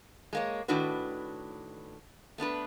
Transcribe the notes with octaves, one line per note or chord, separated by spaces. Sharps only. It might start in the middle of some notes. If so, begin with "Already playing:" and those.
G#3 A#3 C#5
A2 D#3 D4 F#4 B4
A3 B3 D4 B4